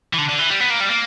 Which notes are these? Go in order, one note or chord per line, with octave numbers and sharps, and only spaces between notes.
E3
D3
D3
E3
G3
B3
A#3
G3
A#3